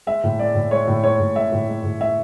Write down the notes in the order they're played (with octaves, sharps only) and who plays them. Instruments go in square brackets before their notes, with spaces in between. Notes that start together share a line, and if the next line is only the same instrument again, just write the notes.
[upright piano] G#3 E5
A2
G#3 D5
A2
G#3 C#5
A2
G#3 C#5
A2
G#3 E5
A2
G#3
A2
G#3 E5